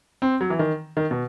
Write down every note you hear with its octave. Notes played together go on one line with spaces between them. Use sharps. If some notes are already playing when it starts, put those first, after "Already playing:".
C4
F#3
E3
D#3
D#3
B2